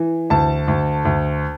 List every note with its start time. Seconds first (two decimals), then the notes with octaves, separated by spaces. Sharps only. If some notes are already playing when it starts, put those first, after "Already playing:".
Already playing: E3
0.30 D2 A5
0.68 D2
1.05 D2